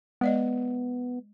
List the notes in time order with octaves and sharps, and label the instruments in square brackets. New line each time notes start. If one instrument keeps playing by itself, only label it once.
[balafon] G#3 D5 D#5 [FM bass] B3